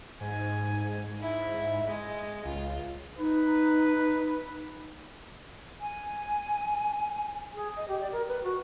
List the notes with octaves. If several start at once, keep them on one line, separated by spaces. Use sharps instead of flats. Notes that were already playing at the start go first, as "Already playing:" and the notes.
G#2 G#5
E4
G#3
C#2 F4
D#4 B4
G#5
G#4
D#5
G4
D5
A#4
B4
F#4